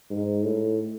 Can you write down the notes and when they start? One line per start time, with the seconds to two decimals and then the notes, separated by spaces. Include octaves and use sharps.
0.10 G#2
0.44 A2